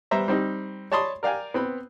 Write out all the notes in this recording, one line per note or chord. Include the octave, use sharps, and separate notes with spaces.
G3 B3 C5 E5 A#5
G3 C4 D#4
C#5 D5 A5 B5 C6 D#6
A#4 D5 F5 G5 G#5
B3 C4 B5